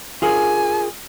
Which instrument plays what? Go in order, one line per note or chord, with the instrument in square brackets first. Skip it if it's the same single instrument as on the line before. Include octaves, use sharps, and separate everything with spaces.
[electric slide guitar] F4 G#4 A#4 [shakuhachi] G#5